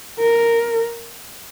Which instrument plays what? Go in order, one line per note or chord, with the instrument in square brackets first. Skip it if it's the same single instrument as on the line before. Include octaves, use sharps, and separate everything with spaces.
[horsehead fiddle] A#4